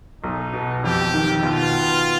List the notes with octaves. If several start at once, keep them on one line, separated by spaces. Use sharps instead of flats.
B1 D#4
B2
F2 G4
D#3
B2 F4
B3